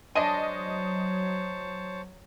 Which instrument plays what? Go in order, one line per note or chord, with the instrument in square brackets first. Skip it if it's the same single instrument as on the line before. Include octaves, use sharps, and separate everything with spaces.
[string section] F#3 [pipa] G#3 D4 [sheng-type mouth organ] C5 C#5 A5 [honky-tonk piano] D#5 D#7